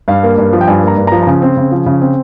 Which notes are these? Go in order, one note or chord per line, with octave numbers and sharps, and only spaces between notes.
G2 F5
A#3
G2
F3
G5
G2 G#5
A#3 A#5
G2
F3 A#5
A#5
C#3 G#5
C4
C#3
F3
C#3
C4